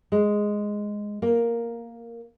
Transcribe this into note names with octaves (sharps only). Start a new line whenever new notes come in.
G#3
A#3